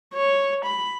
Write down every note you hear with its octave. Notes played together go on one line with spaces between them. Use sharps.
C#5
B5